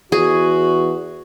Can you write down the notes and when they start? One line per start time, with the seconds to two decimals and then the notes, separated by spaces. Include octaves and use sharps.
0.12 E2 F#4 G#4